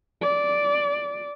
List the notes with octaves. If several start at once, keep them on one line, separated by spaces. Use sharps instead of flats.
D5